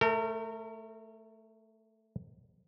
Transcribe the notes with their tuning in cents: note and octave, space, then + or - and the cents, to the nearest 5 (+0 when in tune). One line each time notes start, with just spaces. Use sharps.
A3 +0 A#4 -35